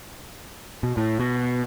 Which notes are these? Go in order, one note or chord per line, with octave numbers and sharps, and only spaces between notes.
B2
A2
B2